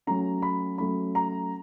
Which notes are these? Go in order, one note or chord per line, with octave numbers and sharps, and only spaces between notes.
F#3 A3 C#4 A#5
B5
F#3 A3 C#4 B5
A#5